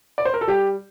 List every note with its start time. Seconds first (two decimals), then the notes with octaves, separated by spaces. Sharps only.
0.18 D5
0.25 C5
0.34 A#4
0.41 A4
0.47 G3 G4